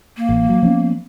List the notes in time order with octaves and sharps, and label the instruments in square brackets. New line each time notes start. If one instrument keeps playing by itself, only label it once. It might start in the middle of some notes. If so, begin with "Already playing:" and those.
[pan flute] A#3
[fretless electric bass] A1
F#3
F3 B3 C#4